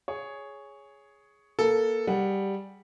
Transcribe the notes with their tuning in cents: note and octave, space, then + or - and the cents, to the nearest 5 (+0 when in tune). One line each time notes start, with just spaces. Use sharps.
G#4 +0 C#5 +5
A#3 +15 A4 +0
G3 +0 G#4 +0 F#5 +0